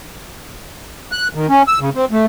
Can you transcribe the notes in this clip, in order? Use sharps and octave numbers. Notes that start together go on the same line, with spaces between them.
F#6
D#3
C#4
E6
C#3
C4
A3